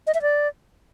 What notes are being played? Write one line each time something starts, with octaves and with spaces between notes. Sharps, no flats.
D#5
E5
D5